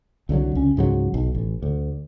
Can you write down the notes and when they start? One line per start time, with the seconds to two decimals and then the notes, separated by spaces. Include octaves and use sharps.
0.29 C2 D3 F3 F#3
0.55 C#2 C#4
0.77 C#2 G#2 F#3
1.14 B1
1.35 A1
1.62 D2